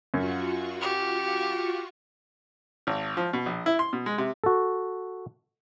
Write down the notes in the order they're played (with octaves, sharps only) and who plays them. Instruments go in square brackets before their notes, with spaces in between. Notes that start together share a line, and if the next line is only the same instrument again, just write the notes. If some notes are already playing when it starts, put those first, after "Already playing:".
[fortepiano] F#2 [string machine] F4 F#4 C#6
[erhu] G4
[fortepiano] G#1
F3
B2
A#1
E4
C6
B2
G#3
C3
[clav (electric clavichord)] F#4 A4